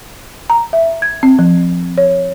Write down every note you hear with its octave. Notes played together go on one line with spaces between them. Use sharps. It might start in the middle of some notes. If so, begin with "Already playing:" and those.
A#5
E5
G#6
C4
F3
C#5